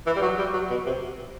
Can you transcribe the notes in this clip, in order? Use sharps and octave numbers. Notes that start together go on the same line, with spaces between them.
E3
G3
F#3
G3
F#3
B2
C3